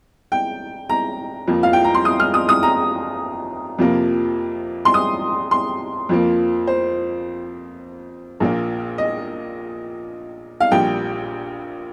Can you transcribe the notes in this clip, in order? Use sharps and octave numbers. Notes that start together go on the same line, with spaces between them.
G5
A#5
F2 F3 A#3
F5
G5
A#5
C6
D#6
F6
D#6
D#6
A#5
F2 C3 F3 A#3
C6
D#6
C6
F2 F3 A#3
C5
A#1 A#2 A#3
D#5
F5
A#1 A#2 G3 G5